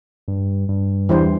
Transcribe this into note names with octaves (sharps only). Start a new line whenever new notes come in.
G2
G2
E2 E3 G3 D4 C5